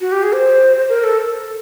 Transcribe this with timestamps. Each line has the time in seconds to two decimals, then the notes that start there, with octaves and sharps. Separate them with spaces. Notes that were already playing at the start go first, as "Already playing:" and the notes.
0.01 F#4
0.12 G4
0.23 G#4
0.34 C5
0.89 A#4
1.04 A4